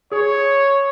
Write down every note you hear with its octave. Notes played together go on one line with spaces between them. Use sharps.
G#4 C#5